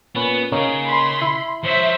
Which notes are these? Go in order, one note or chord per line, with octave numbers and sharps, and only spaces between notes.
A#2 B3 C#4 B4
C#3 A#3 C#4 D#4 G#4
B5 C6
E4
F3 C5 C#5 E5